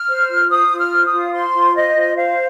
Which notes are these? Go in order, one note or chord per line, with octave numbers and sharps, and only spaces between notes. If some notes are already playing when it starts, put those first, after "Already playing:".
Already playing: F6
C5
F4
C5 D#6
F4
F6
C5
D#6
F4
C5 C6
F4
C5 D#5
F4
C5 F5